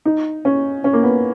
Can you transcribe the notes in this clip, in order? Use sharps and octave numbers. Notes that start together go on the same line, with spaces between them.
D#4
C#4
C#4
A#3
B3